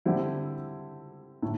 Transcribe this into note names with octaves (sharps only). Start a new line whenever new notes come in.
D3 G3 C4 E4
A2